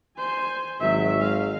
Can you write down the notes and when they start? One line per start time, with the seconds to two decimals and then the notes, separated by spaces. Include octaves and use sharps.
0.18 C5 G#5
0.80 G#1 F#3 E5
1.19 G#3 F5